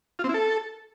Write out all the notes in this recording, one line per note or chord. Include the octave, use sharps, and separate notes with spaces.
F4
C4
E4
A4